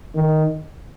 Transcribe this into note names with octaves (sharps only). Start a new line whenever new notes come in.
D#3